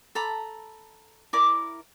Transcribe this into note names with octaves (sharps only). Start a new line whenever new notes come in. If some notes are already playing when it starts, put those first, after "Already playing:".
A4 A#5 B5
E4 A#4 D5 D6